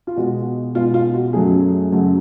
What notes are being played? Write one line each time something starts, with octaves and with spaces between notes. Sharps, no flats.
F4
B2 G#3 F#4
B2 G#3 F4
F4
F#4
F#2 C#3 F#3 A3 G#4
F#2 C#3 F#3 A3 F#4